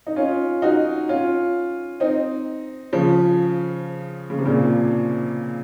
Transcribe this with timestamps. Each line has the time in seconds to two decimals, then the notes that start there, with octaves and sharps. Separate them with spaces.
0.07 D#4
0.16 C#4 F4
0.62 D#4 F#4
1.08 C#4 F4
2.00 C4 D#4
2.93 C#3 F3
4.30 C#3
4.39 C3
4.46 A#2 C#3